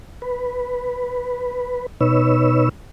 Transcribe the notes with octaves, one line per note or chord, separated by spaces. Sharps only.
B4
B2 D#4 B4 C#5 E6